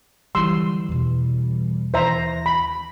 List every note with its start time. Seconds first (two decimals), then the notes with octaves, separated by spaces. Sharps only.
0.35 D3 E3 F#3 G3 C6 E6
0.89 E2 B2
1.94 D#2 E3 C5 E5 A#5 A#6
2.46 C4 B5